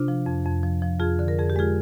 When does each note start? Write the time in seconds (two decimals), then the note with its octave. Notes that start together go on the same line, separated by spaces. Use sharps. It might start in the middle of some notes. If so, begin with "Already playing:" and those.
Already playing: C3 D4 F4
0.08 F3
0.26 F2
0.46 F2
0.63 F3
0.82 F3
1.00 F2 F4 G#4
1.19 D3
1.28 A#4
1.38 F2 G#4
1.50 G4
1.56 G#3 F4 G#4